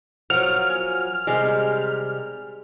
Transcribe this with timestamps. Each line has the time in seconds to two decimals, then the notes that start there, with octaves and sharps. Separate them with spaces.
0.30 F3 F#3 A#4 F#5 F6
0.69 G#5
1.27 C3 D#3 G3 G#3 F5 G5